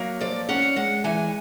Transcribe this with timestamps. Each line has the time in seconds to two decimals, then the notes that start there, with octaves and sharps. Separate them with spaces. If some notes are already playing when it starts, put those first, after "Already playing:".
Already playing: F#3 A#3
0.21 F3 D5
0.49 C#4 F#5
0.76 G#3 F#5
1.04 E3 G#5